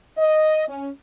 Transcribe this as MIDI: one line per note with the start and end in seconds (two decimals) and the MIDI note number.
0.17 0.67 75
0.68 0.89 61